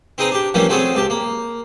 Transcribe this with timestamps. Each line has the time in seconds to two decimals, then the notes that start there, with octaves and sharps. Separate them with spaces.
0.18 C4 D#4 G#4 B4 A#5 B5
0.31 D4 G4
0.54 E3 F3 G3 A3 A#3 C#4
0.69 A3 C4 F#4 G#4 A4 C#5
0.95 C#2 G4 A5
1.10 A#3